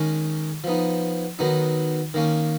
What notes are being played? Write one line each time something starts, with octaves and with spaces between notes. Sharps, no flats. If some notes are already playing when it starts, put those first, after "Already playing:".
Already playing: D#3 G#3 C#4
F3 B3 D#4
D#3 F#3 B3 D#4
D#3 A#3 C#4